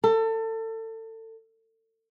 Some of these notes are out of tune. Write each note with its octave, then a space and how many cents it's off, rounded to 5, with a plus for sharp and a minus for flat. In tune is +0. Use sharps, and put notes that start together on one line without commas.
A4 +30